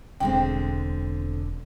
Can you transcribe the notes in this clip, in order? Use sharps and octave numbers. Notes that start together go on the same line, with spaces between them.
E1 D3 G#3 C4 G5